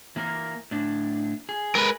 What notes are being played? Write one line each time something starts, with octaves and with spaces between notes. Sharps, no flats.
E3 A#3 A#4
A2 D4
G#4
G#3 G#4 A#4 B4